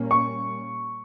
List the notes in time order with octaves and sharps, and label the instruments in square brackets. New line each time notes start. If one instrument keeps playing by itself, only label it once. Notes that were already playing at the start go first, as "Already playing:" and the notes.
Already playing: [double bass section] A#2 G3 A#3 C#4
[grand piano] C#6